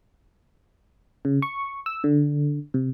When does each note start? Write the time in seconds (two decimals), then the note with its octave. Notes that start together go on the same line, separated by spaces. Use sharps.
1.25 C#3
1.42 C#6
1.86 E6
2.04 D3
2.74 C3